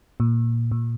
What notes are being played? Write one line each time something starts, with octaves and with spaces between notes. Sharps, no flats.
A#2
A#2